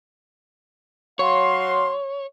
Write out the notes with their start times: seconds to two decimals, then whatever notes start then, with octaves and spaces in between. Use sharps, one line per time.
1.19 F#3 C#5 F5 C6